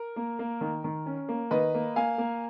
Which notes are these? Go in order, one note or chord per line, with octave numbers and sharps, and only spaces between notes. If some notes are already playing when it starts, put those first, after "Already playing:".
Already playing: A#4
A#3
A#3
D#3
D#3
C#4
A#3
D#3 B4 D#5
A#3
A#3 F5 G#5
A#3